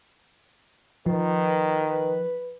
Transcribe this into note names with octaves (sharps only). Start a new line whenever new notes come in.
D#3 F3 B4